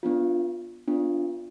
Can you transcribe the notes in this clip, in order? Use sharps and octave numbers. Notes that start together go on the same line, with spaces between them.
B3 D4 F4
B3 D4 F4